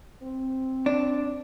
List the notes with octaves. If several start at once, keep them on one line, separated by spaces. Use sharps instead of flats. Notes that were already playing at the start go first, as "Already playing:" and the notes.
C4
D4